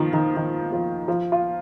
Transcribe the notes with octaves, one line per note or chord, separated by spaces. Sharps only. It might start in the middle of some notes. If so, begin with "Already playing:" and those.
Already playing: D#3 F3
D#3
D#3
F3
F3
F4